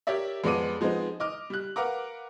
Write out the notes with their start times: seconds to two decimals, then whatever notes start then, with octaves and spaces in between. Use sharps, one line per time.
0.07 G4 A#4 C#5 D5 E5
0.44 F2 G#3 B3 D5 D6 D#7
0.81 F3 G#3 B3 C4 D#4
1.20 D#5 D6 F6
1.50 G3 F#6
1.76 A#4 B4 F5 F#5 A#5 D6